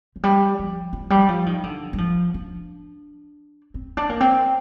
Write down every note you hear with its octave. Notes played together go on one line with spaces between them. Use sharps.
F3
G3
F3
F3
G3
F3
D#3
D3
G3
F3
D4
C4
D4
A#3
C4